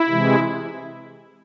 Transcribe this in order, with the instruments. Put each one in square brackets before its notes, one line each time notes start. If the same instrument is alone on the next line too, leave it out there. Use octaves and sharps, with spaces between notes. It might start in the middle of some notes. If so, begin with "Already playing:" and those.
Already playing: [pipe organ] E4
C3 E3 G#3